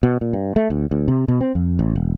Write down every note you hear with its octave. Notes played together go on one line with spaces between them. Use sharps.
B2
A#2
G2
A3
D2
D2
C3
B2
C4
F2
A1
E1